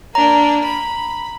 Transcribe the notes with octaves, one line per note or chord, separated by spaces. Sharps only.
A#3 D4 A#5
B5